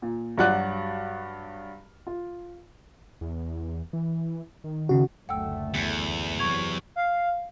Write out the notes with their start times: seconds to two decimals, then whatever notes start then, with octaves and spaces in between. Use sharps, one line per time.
0.02 A#2
0.38 G2 F#3 F#4 D5 F#6
2.07 F4
3.21 E2
3.93 E3
4.64 D#3
4.89 C#3 F#4
5.29 F#1 D2 A3 F#5 G5 E6
5.74 E2 B6 C#7
6.39 C3 F#3 C#6 G#6 F7
6.96 F5